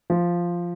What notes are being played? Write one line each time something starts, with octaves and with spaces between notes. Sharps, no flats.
F3